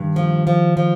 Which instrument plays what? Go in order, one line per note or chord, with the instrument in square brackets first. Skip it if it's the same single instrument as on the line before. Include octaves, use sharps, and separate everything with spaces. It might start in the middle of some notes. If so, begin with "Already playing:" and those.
Already playing: [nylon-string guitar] G2 [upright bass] D#3
[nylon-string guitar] F3
F3
F3